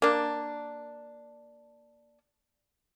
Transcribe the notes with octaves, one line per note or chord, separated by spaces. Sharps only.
A#3 D4